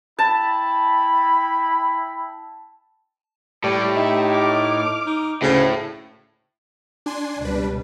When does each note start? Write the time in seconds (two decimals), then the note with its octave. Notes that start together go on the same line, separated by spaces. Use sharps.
0.19 E4 G5 A5 B5
3.64 A2 G3 G4
3.96 D#4 E5
4.30 D6 F6
5.06 D#4
5.42 D2 A2 C#3
7.06 D4 G#5 C6
7.41 C#2 B2 G3 D4 B4